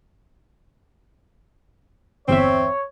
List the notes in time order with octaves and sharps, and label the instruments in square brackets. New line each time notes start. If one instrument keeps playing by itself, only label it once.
[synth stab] G1 E2 E5 [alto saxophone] C4 [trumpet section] C#5